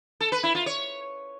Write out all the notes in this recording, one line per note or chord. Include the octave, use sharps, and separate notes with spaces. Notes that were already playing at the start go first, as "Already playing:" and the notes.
A4
B4
E4
F4
C#5